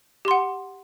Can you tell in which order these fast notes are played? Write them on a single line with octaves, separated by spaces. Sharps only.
G4 C6 F#5